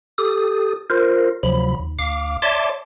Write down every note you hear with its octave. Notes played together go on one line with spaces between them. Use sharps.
G4 A4 D#6
F4 A#4 C5
D2 C3 F3 F#3 B5
D#2
D2 F5 D6
C#5 D5 E5 A5 C6 D6